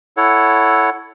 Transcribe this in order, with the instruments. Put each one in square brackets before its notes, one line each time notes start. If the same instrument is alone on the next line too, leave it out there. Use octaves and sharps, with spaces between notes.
[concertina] E4 A4 C#5 F#5